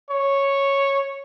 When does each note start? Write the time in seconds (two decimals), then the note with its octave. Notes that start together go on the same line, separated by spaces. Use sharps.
0.10 C#5